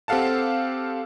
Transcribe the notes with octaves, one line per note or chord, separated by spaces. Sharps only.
C4 G4 A4 F5 F#5 A5